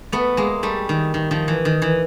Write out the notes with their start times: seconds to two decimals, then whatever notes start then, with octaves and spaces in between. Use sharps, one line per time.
0.12 A3 B3
0.37 G#3 A#3
0.63 G3 A3
0.89 D#3
1.14 D#3
1.31 D#3 F3
1.48 E3
1.65 D#3
1.82 E3